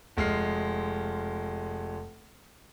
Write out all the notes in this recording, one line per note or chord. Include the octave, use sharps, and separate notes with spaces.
F1 G#3 F6 C7